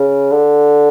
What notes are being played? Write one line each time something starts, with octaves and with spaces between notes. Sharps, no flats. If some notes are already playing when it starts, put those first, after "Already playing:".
Already playing: C#3
D3